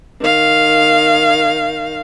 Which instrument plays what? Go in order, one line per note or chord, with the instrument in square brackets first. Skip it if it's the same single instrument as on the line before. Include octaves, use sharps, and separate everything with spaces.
[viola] D#3 F5